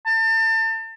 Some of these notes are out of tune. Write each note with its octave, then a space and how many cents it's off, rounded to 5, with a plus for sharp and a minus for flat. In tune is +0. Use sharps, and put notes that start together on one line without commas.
A5 +35